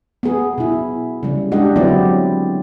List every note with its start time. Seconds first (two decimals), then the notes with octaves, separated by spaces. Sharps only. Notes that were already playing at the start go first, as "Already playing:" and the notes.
0.23 B3 G#4
0.58 B2 E4
1.23 C#3 G3
1.52 G#3 D4 G4 D#5 F#5
1.76 D3 F#3 B3 C4 E4 D5